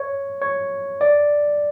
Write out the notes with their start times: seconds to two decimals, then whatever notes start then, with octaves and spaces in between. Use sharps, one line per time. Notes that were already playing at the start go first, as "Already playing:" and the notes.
Already playing: C#5
0.42 C#5
1.01 D5